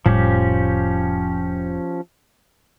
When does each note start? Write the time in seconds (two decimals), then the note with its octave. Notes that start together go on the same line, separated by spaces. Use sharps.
0.06 F1 A2 F3 G3 C#4 G4